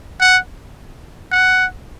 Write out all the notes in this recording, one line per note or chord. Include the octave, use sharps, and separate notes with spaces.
F#5
F#5